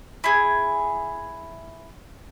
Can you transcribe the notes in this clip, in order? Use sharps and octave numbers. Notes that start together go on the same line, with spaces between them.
E4 G#4